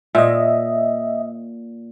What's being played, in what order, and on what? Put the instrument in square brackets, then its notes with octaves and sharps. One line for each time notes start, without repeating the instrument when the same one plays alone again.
[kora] A#2 [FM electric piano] D#5 E5